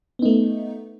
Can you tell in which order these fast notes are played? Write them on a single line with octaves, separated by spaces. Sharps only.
B3 D#4 A3